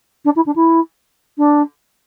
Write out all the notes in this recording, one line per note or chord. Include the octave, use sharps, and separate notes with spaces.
D4
E4
D4
E4
D4